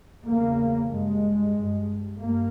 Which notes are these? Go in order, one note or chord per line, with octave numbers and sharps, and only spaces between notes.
E2 C#3 A#3
G2 G#3
G2
G2 A#3